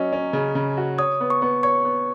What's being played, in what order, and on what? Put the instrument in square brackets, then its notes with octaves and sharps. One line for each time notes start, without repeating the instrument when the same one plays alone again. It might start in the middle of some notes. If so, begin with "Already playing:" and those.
Already playing: [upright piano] F#3 C#4 [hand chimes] D#5
[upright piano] C#4
C#3
C#3
F#4
[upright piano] C#5 [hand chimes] D#6
[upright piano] B3
[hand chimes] C#6
[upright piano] B3
[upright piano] C#5 [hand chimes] C#6
[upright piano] B3